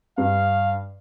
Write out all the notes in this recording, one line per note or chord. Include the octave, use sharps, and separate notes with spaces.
G2 F5